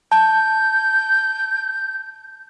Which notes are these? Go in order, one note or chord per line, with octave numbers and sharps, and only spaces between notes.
A5 G6